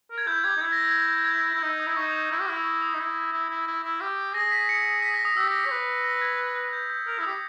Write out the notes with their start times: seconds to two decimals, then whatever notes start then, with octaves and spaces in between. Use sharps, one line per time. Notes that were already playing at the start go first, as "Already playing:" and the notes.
0.11 A#4
0.18 G#6
0.27 E4 G6
0.44 G4 G#6
0.57 D#4
0.61 E4 G#6
0.72 A#6
0.84 G#6
0.95 G#6
1.24 G#6
1.29 G6
1.55 E4
1.63 D#4 E6
1.80 D#6
1.86 E4
1.96 D#4 C#6
2.08 D#6
2.20 D#6
2.31 E4 E6
2.41 G4
2.48 E4 E6
2.57 D#6
2.64 C#6
2.82 D#6
2.94 D#4
2.99 E4 D#6
3.33 E4
3.50 E4
3.67 E4
3.84 E4
4.01 G4
4.34 G#4 A#6
4.52 B6
4.69 C#7
5.02 B6
5.14 A#6
5.25 D#6
5.37 G4 E6
5.48 A#6
5.60 B6
5.65 C#5
5.71 B4
6.04 A#6
6.21 G#6
6.73 G6
6.90 G6
7.07 A#4 E6
7.19 E4
7.23 D#6
7.27 G4